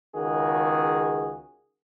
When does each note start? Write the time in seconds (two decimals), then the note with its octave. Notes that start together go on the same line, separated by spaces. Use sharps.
0.15 C#2 D#3 F#4 G#4